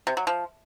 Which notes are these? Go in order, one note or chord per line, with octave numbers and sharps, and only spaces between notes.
C3
F#3
F3